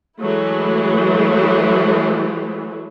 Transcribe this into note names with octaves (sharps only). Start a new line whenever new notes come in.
E3 F#3 G#3 A3 E4